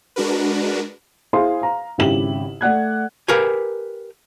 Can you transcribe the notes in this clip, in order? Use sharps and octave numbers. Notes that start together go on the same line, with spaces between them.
G#3 D4 F#4 A#4 B4
E4 G#4 C5 F5 C6
F5 A#5
G#1 C#3 E4 G4 E7 F#7
A3 D5 F#5 F#6 G#6
G4 A#4 B4 F5 G#5